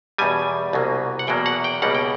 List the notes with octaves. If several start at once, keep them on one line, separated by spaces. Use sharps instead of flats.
E2 B2 G3 G#5
C2 B2 F#3 A#3
F#5
E2 B2 F#3 A#3 G5
F#5
G5
C#2 B2 G3 A#3 F#5
G5